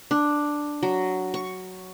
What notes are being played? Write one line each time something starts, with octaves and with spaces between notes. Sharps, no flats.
D4
F#3
C#6